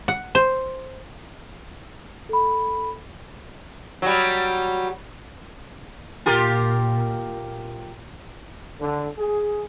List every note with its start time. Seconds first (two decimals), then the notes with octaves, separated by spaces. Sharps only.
0.08 F#5
0.35 C5
2.29 A4 B5
4.02 F#3 G3
6.26 A#2 F4 G4 A#4
8.80 D3
9.18 G#4